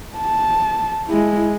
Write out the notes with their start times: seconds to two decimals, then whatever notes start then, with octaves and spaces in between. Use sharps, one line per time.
0.17 A5
1.08 G#3 E4